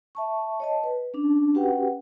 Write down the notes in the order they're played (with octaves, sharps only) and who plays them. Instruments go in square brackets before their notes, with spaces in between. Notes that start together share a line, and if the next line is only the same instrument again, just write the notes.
[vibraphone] E5 A5 C#6
C#5 D#5 A5
B4
C#4 D4
C#4 F#4 G4 B4 F#5 G5